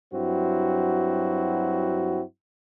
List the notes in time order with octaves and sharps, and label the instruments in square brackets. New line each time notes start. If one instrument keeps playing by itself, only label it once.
[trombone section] G2 F#3 C4 E4 F#4